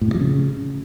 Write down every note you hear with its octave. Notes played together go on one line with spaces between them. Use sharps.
A2
C3
F3
C#3